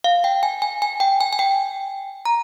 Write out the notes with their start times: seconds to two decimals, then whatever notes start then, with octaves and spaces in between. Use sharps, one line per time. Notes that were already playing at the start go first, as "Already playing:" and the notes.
0.04 F5
0.24 G5
0.43 G#5
0.62 G#5
0.82 G#5
1.00 G5
1.21 G#5
1.33 G#5
1.39 G5
2.25 A#5